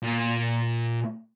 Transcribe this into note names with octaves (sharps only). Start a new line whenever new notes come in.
A#2